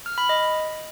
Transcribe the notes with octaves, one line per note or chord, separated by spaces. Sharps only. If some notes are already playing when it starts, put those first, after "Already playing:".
F6
B5
D#5